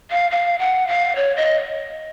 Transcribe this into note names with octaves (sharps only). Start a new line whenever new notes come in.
F5
F5
F#5
F5
C#5
D#5